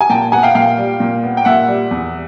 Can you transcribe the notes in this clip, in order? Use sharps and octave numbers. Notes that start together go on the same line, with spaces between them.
G#5
A#2 G5 A5
B3 F#5 G#5
F5 G5
A#2 F5 G5
G3
A#2
B3
G5
A#2 E5 F#5
G3
E2